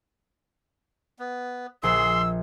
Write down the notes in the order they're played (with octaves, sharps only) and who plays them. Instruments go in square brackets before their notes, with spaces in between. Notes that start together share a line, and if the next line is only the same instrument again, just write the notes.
[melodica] B3
[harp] A#1 [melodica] G#4 C6 [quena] E6